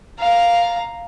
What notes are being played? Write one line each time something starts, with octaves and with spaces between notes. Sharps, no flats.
F5 A#5